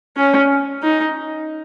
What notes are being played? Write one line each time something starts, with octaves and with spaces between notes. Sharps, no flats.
C#4
D#4